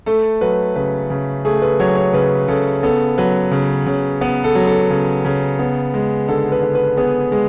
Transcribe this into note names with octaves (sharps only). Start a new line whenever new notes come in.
A3 A4
F#3 B4
C#3 B4
C#3
A3 G#4
B4
F#3 C#5
C#5
C#3 B4
C#3 A4
B3 A4
F#3 B4
C#3
C#3
B3 B4
A4
F#3
A4
C#3
C#3
B3
G#3
D3 A4
B4
D3
B4
B3 G#4
G#3